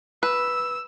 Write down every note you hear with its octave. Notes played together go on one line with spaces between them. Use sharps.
B4 E6